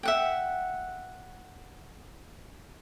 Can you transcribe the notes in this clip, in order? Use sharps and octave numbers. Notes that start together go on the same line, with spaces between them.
E5 F#5 G5